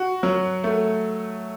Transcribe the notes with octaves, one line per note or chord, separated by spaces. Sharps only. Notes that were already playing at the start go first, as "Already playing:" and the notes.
Already playing: F#4
F#3
A3